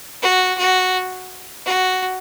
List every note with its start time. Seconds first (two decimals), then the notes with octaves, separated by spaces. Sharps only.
0.22 F#4
0.58 F#4
1.66 F#4